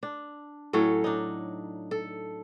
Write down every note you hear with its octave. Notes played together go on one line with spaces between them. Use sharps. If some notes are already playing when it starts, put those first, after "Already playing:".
D4
A2 F#3 C#4 A4
D4 D#4
A4